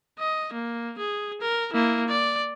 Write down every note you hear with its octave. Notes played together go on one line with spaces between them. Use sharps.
D#5
A#3
G#4
A#4
A#3 E4
D5